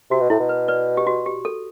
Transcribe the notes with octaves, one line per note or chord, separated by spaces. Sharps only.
C3 F#4
B2
A2 E4
B2
B4
B4 D5
G4
F#4
G4
A4